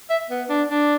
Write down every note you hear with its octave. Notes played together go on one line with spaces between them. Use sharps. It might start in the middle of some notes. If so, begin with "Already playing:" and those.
E5
B3
D4
D4